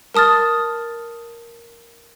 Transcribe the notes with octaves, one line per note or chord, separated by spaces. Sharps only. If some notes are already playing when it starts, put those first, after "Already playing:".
A#4 A5 D#6 F6 A6